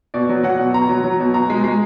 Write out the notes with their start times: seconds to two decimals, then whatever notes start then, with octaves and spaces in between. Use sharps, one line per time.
0.14 B2 D5
0.29 F#3
0.43 F#3 F#5
0.59 B2
0.74 B2 A#5
0.89 F#3
1.04 F#3
1.20 B2
1.33 B2 A#5
1.50 G#3
1.64 G#3